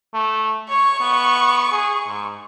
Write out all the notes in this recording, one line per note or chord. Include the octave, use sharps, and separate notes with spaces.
A3
C#5 C#6
B3
G#4
G#2